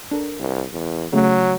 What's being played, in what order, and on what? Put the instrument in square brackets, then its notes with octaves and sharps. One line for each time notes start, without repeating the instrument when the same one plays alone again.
[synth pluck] D4 A4 A#4
[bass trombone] C2
E2
[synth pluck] C#3 A3 [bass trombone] F#3